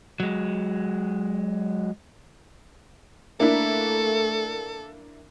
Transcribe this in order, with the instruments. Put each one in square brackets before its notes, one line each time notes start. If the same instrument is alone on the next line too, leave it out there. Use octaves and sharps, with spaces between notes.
[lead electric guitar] F#3 G#3
[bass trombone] A3 [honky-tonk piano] A#3 D4 E4 [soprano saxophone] A4